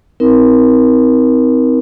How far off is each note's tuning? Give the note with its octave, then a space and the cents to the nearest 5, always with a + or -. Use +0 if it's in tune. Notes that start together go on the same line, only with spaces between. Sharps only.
C4 -25 D#4 +35 A#4 +25